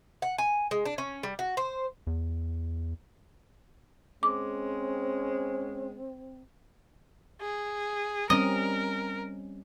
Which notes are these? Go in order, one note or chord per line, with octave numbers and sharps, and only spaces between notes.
F#5
G#5
G#3
D4
C#4
G3
F#4
C5
E2
G#3 C4 C#4 D6
G#4
G3 C4 C#4 A#4 D#5